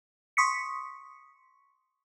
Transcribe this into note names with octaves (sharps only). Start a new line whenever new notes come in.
C6 C#6 D#6 B6 C#7